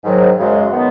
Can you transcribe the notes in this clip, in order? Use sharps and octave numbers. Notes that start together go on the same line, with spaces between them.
G#2 D#3 F#3
F#2 C#3 G#3
D#3 G#3 B3